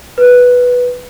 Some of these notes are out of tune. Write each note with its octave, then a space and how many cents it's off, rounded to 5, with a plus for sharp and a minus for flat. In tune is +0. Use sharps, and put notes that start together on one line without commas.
B4 -5